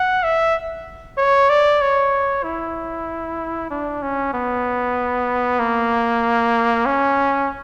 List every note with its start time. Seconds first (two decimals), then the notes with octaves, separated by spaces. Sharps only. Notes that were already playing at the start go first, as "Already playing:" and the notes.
Already playing: F#5
0.23 E5
1.18 C#5
1.49 D5
1.81 C#5
2.44 E4
3.70 D4
4.02 C#4
4.33 B3
5.59 A#3
6.86 C#4